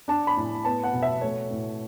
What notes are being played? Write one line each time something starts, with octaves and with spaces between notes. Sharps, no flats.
D4 A5
B5
A2
B3 A5
F#5
B2
E5
A3 C#5
A2